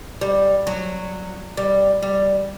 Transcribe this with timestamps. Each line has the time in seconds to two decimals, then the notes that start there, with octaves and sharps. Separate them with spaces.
0.21 G3
0.67 F#3
1.57 G3
2.03 G3